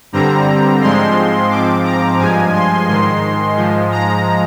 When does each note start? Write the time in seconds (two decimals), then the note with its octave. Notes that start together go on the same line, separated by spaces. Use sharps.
0.13 G2 D3 G3 C4 A#5
0.81 G#2 F3 G#3 C4 C6
1.50 G#2 F3 C4 D6
1.84 A#5
2.19 G2 F3 G#3 G#5
2.53 C6
2.88 G#2 D#3 G#3 C6
3.56 G#2 F3 G#3
3.91 A#5